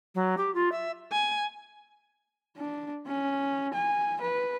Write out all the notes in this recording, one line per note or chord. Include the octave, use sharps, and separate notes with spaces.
F#3
G4
F4
E5
G#5
D4
C#4
G#5
B4